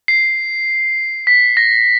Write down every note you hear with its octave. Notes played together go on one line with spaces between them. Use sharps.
C7
B6
A#6